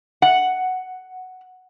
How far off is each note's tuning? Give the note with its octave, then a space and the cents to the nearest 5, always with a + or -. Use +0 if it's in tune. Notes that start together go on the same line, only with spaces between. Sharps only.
F#5 +5